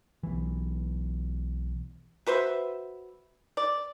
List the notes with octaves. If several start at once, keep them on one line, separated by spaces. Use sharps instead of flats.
B1 E3
F#4 B4 C5 E5
D5